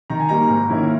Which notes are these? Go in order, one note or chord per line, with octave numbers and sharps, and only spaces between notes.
D#3 A#5
G#5
G3 A#3 D#4 A#5
G#2
D#3 A#3 C#4 E4